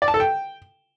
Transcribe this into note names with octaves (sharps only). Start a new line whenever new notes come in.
D5
A5
A4
G5